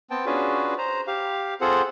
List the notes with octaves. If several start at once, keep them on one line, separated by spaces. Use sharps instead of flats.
B3 C4 G5 A5
C#4 D4 F4 F#4 G#4 B4
C5 A#5
G4 F5
C4 F4 G#4 A4 C5 F#5